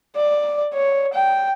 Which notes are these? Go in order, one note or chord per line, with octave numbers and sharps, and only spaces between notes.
D5
C#5
G5